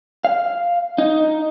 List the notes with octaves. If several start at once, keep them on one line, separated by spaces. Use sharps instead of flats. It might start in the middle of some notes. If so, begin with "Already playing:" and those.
F5
D#4